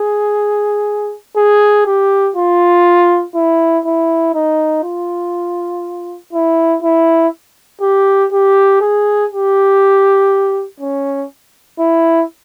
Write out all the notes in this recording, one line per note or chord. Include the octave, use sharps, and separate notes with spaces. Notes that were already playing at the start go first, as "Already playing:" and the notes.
Already playing: G#4
G#4
G4
F4
E4
E4
D#4
F4
E4
E4
G4
G4
G#4
G4
C#4
E4